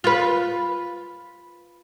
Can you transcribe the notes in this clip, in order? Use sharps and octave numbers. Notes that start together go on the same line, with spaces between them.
F4 B4